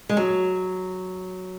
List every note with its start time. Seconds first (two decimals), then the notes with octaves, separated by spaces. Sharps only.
0.09 G#3
0.17 F#3